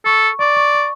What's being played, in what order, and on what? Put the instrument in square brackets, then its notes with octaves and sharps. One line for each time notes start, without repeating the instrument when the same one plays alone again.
[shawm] A4 [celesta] C#6
[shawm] D5 [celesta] C#6
[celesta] C#6
C#6